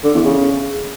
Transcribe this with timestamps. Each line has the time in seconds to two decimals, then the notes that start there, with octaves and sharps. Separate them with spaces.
0.04 D3
0.14 E2
0.25 C#3